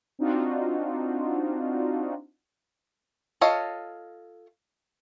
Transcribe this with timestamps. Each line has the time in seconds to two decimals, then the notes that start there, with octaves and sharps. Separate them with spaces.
0.19 C4 D4 D#4 F4 F#4
3.41 F4 A4 C#5 D#5 F5